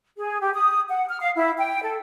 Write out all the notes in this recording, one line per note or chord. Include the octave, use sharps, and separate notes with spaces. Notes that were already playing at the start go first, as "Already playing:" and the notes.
G#4
G4
D#6
F#5
F6
F5
E4
G5
A4